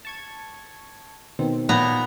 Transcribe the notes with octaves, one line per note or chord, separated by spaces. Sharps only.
A5 C#6 G#6
B2 D#3 C4
A#2 B3 A#5